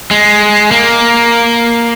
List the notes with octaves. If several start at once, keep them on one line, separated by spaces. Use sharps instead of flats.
G#3
A#3